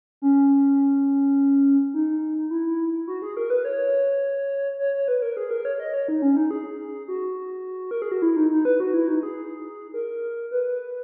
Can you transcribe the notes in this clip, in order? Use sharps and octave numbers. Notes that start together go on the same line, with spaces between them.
C#4
D#4
E4
F#4
G#4
A#4
B4
C#5
C#5
C#5
B4
A#4
G#4
A#4
C#5
D#5
C#5
D#4
C#4
D#4
G#4
F#4
A#4
G#4
F#4
E4
D#4
D#4
B4
F#4
E4
D#4
G#4
A#4
B4